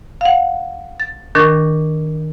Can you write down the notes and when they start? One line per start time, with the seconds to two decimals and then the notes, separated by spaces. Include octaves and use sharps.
0.21 F5 F#5
1.00 A6
1.35 D#3 D4 A#4 C#6 G6 A6